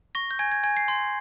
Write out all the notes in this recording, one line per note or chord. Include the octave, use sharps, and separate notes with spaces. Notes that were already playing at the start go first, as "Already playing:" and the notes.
C#6 A#6
G6
G#5 G#6
G#6
G#5 G#6
C7
C6